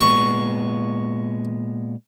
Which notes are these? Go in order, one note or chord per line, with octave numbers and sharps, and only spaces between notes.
A#2 G#3 B3 C#6